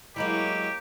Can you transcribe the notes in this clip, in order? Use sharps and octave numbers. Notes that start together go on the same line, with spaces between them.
F#3 G#3 A#3 E4 G4 C#5